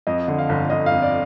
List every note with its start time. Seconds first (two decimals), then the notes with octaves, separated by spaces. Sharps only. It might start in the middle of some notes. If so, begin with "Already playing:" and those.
0.07 F2 D#5
0.28 D3
0.39 F5
0.49 G1
0.70 G1 D#5
0.86 F2 F5
1.02 D5